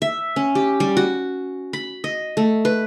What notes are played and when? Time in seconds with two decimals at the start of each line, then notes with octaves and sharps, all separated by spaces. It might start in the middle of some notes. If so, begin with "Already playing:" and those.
0.02 E5
0.36 C#4
0.55 G4
0.80 G3
0.97 F#4
1.73 B5
2.04 D#5
2.37 A3
2.65 B4